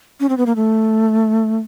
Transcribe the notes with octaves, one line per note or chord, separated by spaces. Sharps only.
C#4
C4
B3
A#3
A3